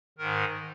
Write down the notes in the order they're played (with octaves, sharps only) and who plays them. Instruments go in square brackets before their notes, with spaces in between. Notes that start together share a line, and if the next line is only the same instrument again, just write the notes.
[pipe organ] G#2 D#3 A#4